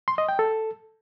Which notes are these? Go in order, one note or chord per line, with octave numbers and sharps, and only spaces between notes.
C6
D#5
G5
A4